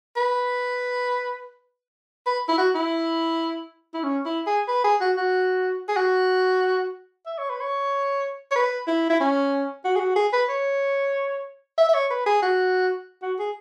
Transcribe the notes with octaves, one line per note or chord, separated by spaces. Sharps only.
B4
B4
E4
F#4
E4
E4
C#4
E4
G#4
B4
G#4
F#4
F#4
G#4
F#4
E5
C#5
B4
C#5
C#5
B4
E4
E4
C#4
F#4
G#4
F#4
G#4
B4
C#5
E5
E5
C#5
B4
G#4
F#4
F#4
G#4